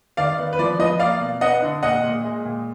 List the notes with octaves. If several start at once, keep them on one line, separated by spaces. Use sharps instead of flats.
D#3 D5 F5
B3
B4
F3 D5
F3 B4 D#5
A#3 D5 F5
B2
B3 D#5 F#5
D3
A#2 D#5 F#5
A#2
G#3
A#2